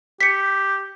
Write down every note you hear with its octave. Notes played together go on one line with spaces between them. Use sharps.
G4 B6 C#7